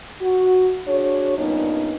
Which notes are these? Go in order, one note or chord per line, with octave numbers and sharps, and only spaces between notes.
F#4
D4 F#4 G#4 C#5
G2 A#2 G3 B3 C#4 D#4